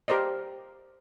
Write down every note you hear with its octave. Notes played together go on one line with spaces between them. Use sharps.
G4 A#4 C5 D5 D#5